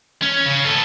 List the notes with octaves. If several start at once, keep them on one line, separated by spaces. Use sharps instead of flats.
C#4
C#3
A4 B4